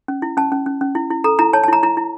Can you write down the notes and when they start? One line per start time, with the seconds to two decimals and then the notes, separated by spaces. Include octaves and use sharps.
0.08 C#4
0.22 E4
0.37 C#4 A5
0.52 C#4
0.66 C#4
0.81 C#4
0.95 E4
1.11 E4
1.24 A4 A#5
1.39 E4 A#5
1.53 C#5 A5
1.64 A5
1.68 E4 A#5
1.83 E4 A#5
1.97 E4